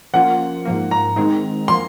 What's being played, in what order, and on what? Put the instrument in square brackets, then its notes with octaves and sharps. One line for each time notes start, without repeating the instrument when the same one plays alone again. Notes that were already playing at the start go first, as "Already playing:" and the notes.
[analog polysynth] F3 A#3 C#4 F4 [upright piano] F#5
[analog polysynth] G#2 F3 A#3
[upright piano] A#5
[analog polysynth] D#3 G#3 C4 D#4
[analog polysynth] F3 A#3 [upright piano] C6